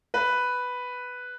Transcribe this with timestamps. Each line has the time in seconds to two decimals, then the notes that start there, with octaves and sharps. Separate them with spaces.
0.14 B4